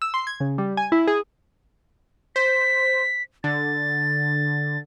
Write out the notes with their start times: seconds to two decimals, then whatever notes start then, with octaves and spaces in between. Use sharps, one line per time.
0.02 E6
0.14 C6
0.27 G#6
0.40 C#3
0.58 G3
0.77 G#5
0.92 E4
1.07 G#4
2.36 C5 B6
3.44 D3 A6